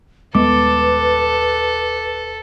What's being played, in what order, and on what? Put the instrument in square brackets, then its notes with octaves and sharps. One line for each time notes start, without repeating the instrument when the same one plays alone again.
[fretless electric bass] D#1 G#3 B3 [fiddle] A4 [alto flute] B4 [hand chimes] D6